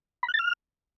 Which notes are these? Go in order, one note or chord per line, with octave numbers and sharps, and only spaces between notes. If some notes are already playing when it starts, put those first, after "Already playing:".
B5
F#6
A6
F6